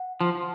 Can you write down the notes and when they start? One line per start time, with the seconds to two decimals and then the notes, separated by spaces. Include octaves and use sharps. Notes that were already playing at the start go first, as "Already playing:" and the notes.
Already playing: F#5
0.21 F3 A5